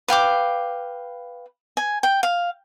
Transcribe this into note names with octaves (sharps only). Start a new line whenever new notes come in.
B4 F5 G5 D6
G#5
G5
F5